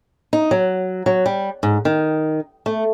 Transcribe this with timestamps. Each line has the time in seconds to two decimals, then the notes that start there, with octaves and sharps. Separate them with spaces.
0.33 D#4
0.51 F#3
1.06 F#3
1.26 G3
1.63 G#2
1.85 D#3
2.66 A3